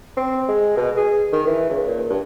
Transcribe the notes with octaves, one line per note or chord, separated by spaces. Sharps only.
C4
G#3
B2
G#4
D#3
E3
C#2
A#2
G2